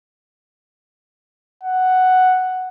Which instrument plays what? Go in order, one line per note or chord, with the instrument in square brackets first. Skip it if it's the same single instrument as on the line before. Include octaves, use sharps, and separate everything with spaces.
[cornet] F#5